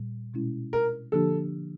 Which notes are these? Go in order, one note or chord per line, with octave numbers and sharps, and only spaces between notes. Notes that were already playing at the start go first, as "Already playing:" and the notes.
Already playing: A#2 G3
B2 G#3 C#4 E4
A#4
D3 F3 A#3 D4 G4 A4